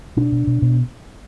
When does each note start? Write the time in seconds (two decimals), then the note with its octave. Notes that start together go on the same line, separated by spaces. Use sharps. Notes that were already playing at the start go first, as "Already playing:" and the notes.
0.17 B2 D4
0.32 B2
0.47 B2
0.62 B2